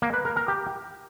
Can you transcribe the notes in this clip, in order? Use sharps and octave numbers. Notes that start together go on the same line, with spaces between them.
A#3
B4
A#4
A#4
G4